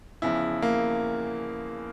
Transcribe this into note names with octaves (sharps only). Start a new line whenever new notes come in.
E2 C#3 F3 E4
A#3